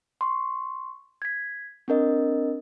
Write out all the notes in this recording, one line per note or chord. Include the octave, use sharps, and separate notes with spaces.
C6 C#6
G#6 B6
C4 D4 A#4 D#5